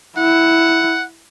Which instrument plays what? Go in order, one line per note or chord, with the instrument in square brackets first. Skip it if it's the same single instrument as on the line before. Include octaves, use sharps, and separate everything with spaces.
[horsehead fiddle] E4 [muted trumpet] F#5